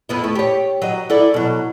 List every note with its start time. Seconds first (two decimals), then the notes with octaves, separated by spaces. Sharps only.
0.09 F2 B3 E4
0.24 A3
0.35 G4 C#5
0.82 F#3 D#5
1.10 E4 A4 D5
1.34 B2 F#3